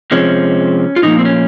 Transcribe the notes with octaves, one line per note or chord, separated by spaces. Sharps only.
C3 F3 G#3 C4 C#4
F4
A#2 F3 A#3 D#4
C4
C#4